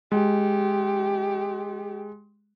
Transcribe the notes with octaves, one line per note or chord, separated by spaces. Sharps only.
G#3 G4